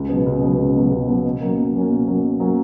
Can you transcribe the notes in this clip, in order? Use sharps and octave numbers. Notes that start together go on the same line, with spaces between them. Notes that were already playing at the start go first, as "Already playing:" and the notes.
Already playing: C#2
B2 F#3 B3
C#2
B2 F#3 B3
C#2
B2 F#3 B3
C#2
B2 F#3 B3
B2
F#3 A#3 C#4
B2
F#3 A#3 C#4
B2
F#3 A#3 C#4
B2
F#3 A#3 C#4